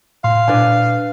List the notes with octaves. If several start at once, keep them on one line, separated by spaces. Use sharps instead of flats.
A2 F5 C6
A#2 D4 B4 G#5